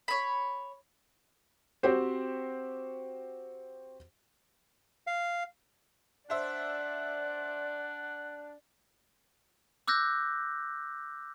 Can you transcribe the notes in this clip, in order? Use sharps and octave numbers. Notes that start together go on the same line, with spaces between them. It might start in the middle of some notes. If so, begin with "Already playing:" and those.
C#5 B5
C4 F#4 G4 C5
F5
D4 C5 D5 E5 F#5
D6 E6 F#6 G6 A#6